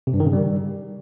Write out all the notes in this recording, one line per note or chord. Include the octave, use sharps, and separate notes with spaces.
C3
G2
D#3
C#3
G3